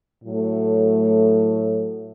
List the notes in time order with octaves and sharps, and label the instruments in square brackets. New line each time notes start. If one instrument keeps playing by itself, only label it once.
[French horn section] A2 F#3 A3